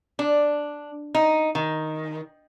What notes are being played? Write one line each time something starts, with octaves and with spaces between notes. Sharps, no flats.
D4
D#4
D#3